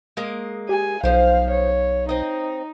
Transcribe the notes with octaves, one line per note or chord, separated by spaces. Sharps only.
G#3 A#3 D#5
G4 G#5
B1 F3 C5 F5
C#5
C4 D#4 D#5